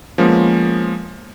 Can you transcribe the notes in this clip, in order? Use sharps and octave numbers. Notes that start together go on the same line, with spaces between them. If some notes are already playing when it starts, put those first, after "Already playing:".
F3 G#3 A#3 B3 C#4